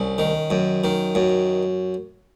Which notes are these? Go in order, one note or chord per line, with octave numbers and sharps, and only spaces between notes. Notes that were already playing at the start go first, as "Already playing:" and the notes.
Already playing: C2 C#4
D#3
F#2
D#3
F#2